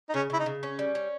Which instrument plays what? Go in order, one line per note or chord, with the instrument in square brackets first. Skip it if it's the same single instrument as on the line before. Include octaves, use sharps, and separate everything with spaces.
[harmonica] D#4
[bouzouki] C#3 [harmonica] C#4
[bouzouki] C#3 [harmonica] E4
[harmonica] D#4
[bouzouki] C#3
C#4
G3
C#4